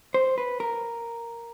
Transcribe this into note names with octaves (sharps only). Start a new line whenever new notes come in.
C5
B4
A#4